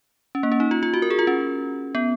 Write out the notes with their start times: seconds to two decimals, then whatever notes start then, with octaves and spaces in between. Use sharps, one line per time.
0.35 C#4
0.43 A#3
0.52 C#4
0.60 D#4
0.71 F4
0.83 F4
0.94 F#4
1.02 A#4
1.10 G#4
1.19 F4
1.27 C#4
1.95 B3